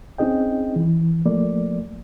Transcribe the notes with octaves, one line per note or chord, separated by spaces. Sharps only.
C4 C#4 D#4 G#4 D#5 G5
E3
F3 A3 A#3 D5